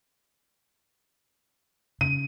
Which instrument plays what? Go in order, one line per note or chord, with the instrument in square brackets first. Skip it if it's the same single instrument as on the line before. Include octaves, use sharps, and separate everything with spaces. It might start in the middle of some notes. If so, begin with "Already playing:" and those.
[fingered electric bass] C#3 [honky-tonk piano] D#7